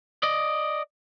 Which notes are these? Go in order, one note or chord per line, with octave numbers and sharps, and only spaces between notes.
D5 D#5